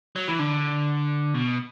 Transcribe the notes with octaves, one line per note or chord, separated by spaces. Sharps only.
F#3
E3
D3
B2